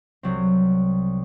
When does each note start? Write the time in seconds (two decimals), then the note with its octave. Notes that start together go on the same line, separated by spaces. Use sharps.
0.23 C2 F#3 C4